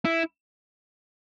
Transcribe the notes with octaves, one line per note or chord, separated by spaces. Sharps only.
E4